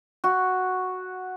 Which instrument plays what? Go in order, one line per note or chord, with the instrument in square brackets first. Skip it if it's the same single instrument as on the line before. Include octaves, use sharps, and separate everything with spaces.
[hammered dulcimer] F#4